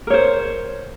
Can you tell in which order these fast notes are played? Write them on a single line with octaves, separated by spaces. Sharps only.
A#4 C#5 C5